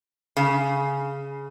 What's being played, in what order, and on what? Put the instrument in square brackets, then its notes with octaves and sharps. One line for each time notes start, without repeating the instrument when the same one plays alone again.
[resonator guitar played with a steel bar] C#3